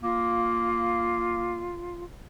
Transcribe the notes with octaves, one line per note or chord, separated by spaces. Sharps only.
A#3 F4